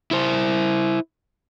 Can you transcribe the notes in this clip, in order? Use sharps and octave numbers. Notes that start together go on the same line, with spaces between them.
E4 C5